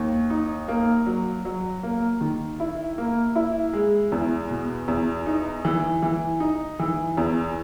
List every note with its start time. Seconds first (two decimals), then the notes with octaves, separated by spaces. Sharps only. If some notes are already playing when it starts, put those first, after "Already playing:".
Already playing: D#2
0.30 D#4
0.68 A#3
1.06 F#3
1.45 F#3
1.83 A#3
2.21 D#3
2.60 E4
2.98 A#3
3.36 E4
3.73 G#3
4.12 E2
4.50 B2
4.88 E2
5.26 D#4
5.65 E3
6.02 E3
6.40 D#4
6.79 E3
7.17 E2